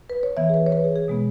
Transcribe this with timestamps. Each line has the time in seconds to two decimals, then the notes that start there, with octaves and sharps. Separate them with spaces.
0.10 B4
0.23 C#5
0.37 E3 B3 E5
0.49 G#4
0.54 B4
0.66 C#5
0.72 B4
0.84 G#4
0.96 G#4
1.08 B2 G#3 B3